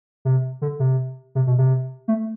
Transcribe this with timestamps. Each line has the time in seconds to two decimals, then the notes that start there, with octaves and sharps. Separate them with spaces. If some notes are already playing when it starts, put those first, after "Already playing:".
0.25 C3
0.62 D3
0.80 C3
1.35 C3
1.47 B2
1.58 C3
2.08 A3